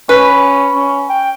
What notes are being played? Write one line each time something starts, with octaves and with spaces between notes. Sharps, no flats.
C#4 B4
C#4
G5